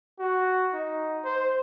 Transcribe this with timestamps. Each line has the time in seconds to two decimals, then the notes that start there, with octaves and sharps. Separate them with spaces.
0.19 F#4
0.74 D#4
1.25 C5